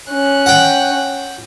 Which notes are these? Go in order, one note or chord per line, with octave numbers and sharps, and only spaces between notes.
C#4 F#6
F#5 G5